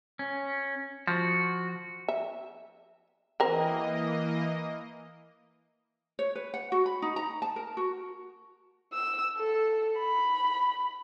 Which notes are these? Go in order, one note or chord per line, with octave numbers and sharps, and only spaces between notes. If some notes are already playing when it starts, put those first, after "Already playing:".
C#4
F3 F#4
E5
E3 A#3 C4 A#4 D#5
C#5
B4
F#5
F#4
B5
D#4
A#5
A5
A#4
F#4
E6
A4
B5